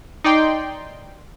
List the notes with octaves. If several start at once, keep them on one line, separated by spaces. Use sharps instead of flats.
D#4 D5 G5 C6